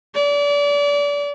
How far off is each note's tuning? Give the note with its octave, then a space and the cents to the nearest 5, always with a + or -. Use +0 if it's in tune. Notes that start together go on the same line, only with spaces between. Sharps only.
D5 -35